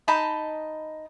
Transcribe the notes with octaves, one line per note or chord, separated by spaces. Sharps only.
D#4 D#5 A5 B5